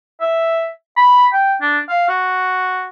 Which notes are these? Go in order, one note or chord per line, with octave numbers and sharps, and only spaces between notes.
E5
B5
G5
D4
F5
F#4